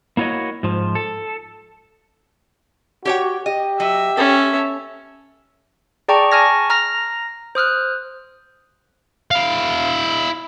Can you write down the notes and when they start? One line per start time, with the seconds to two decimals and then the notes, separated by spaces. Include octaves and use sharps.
0.17 A#3 E4 F#4 C#5 D#5
0.63 G#2 F3
0.95 A4
3.05 F#4 G4 C#5 G5
3.46 G4 D#5
3.80 F#3 D#5 E5
4.17 C#4 A4 E5
6.08 G#4 D5 G5 A5 A#5 C#6
6.32 G#5 A5 C#6 F6 G#6 A#6
6.70 A#5 F6 A#6
7.55 C5 D#6 F6 F#6
9.31 E4 F5